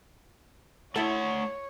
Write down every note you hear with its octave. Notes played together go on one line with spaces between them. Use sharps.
A3 E4 A4 C#5 F#5